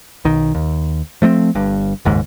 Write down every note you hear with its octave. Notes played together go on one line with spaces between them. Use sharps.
B1 D#3
D#2
F3 A3 A#3 C4
G1 G2
F#1 D#2 G#2